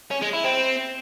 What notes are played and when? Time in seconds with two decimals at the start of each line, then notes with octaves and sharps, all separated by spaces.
0.11 C#4
0.22 G#3
0.33 E4
0.44 C4